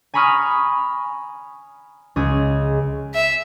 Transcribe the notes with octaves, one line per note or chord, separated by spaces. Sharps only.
G#5 A#5 B5 C#6 D#6 F6
C#2 G#4
E5